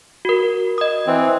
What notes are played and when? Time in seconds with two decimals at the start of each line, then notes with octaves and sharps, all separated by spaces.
0.25 F#4 A#4
0.78 D#5 D#6
1.07 E3 C4